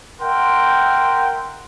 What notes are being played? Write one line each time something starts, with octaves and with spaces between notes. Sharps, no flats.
A#4 E5 F#5 G5 C6